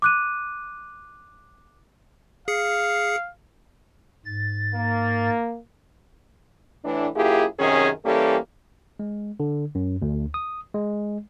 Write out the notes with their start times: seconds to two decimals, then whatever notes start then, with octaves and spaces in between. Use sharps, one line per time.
0.02 D6 F#6 D#7
2.48 G#4 F5 C7 C#7
4.25 G#2 A6
4.75 A#3
6.85 A2 E3 D4
7.16 F#2 A#3 E4 F4 G4 G#4
7.59 F#2 C3 D#3 C#4 G#4
8.05 E3 G3 A#3 C#4 G4 A4
8.99 G#3
9.40 D3
9.75 F#2
10.02 D2
10.34 D#6
10.75 G#3